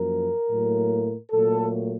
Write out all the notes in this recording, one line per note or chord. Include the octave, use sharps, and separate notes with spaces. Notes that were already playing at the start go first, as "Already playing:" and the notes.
Already playing: F#2 F3 A#3 A#4
A2 F#3 A#3
A#2 F#3 A3 A4